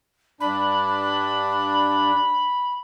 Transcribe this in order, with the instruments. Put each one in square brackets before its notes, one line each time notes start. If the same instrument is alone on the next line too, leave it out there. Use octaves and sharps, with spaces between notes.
[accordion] G2 D4 [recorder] B5